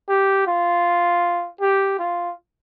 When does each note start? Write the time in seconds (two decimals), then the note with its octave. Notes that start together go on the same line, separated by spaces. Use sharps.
0.09 G4
0.47 F4
1.61 G4
1.99 F4